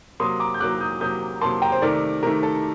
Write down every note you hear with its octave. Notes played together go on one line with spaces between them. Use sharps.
C3 F#3 A#3 C6 D#6
A#5 D6
G6
C3 F#3 A#3 D6 F#6
D#6 G6
C3 F#3 A#3 D#6 G6
C3 F#3 A#3 A5 C6
G5 A#5
C5
C3 D#3 A3 A#4 D5
C3 D#3 A3 A#4
A4